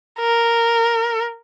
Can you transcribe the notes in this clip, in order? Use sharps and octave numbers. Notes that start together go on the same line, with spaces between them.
A#4